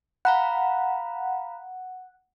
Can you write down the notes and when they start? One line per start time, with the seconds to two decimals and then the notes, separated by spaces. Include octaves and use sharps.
0.25 F5 F#5 A#5 B5